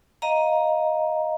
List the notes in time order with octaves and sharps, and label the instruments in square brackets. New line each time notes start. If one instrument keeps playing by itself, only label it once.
[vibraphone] D#5 F5 A#5